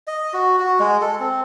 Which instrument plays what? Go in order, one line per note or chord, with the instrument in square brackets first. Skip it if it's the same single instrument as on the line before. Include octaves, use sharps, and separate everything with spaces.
[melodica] D#5
F#4
F#4
G#3
A4
C4